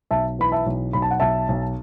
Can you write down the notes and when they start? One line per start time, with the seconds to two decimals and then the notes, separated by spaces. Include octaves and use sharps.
0.11 B1 E5 A5
0.39 E3 B5
0.52 E5 A5
0.66 B1
0.93 B1 B5
1.02 A5
1.11 F#5
1.20 B1 E5 A5
1.48 B1